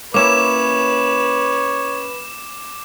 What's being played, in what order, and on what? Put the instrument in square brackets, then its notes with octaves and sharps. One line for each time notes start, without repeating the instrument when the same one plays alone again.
[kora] A#3 C#4 E4 [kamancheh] B4 [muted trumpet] C#5 [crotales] D6 E7